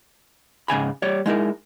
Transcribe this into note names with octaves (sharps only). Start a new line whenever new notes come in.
G#2 C#3 G#5 B5
G3 C#5 D5
G#3 D#4 E4 A#4